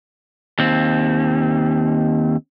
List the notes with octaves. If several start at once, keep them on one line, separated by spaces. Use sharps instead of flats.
D#2 C4